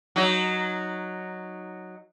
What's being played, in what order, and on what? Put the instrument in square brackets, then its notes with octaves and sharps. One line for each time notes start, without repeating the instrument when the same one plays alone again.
[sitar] F#3 D#4